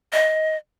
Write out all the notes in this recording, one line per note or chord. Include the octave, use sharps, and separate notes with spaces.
D#5